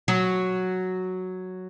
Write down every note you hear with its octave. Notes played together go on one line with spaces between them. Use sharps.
F#3